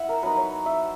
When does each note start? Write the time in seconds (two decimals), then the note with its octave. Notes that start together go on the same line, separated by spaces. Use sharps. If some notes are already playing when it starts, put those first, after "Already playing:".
Already playing: E4 E5 F#5
0.09 A#4
0.23 F#3 B3 D#4 B4
0.37 C#5
0.66 E5